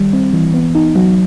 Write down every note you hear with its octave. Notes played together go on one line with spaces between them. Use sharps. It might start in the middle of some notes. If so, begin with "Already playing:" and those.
Already playing: D#3 G3
C4
E3
B3
D#4
F#3